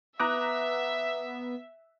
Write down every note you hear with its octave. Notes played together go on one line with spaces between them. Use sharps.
B3 E5 A#5 D6 D#6 F#6 A#6